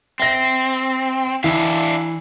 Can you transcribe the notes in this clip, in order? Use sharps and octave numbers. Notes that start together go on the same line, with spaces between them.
C4 E5 A#6
E3 D4 E5 F5